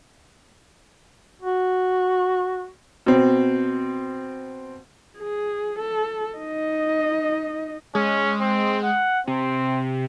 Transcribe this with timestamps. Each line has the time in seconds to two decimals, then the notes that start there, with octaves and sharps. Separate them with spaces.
1.42 F#4
3.06 B2 C4
5.18 G#4
5.79 A4
6.38 D#4 D#5
7.95 G#3 C#4
8.41 C4
8.84 F#5
9.27 C3 C4